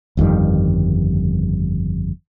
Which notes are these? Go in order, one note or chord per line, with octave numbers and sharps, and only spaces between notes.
G1 F2 D#3 G3